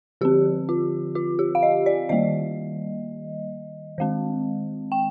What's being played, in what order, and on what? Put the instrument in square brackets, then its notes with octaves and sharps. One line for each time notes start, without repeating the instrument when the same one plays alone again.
[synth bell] D3 F3 C4 G4
F4
F4
G4
F5
D#5
D5
D#3 G3 A#3 D#5
D#3 G#3 C4
G5